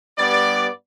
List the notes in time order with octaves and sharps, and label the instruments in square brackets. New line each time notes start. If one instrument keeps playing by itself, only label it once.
[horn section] G2 G3 B3 D5